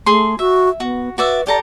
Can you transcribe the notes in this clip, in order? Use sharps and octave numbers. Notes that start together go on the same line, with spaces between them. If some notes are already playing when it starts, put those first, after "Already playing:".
A3 G#4 C6
F#4 E5
B3 F#4
F#4 B4 D5 E5
G4 A4 D5 A#5